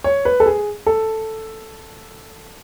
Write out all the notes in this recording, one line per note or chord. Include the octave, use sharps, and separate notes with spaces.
C#5
B4
A4
G#4
A4